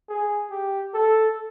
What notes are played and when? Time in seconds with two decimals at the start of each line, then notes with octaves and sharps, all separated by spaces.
0.09 G#4
0.51 G4
0.94 A4